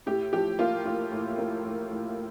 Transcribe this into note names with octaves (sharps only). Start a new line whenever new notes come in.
A2 G4
F3 G4
A#3 F4
A2 F4
A2
A#3
A2
A2